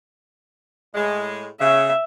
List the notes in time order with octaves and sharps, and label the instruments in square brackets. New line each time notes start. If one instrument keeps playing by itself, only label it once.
[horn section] A2 G#3
[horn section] C#3 [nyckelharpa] E5